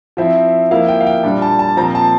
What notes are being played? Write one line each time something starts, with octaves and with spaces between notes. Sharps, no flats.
F3 C4 E4 E5
F3 A#3 E4 F5
G5
F5
G5
A#2 G3 D4
A5
A5
A#2 F3 C4 A#5
A5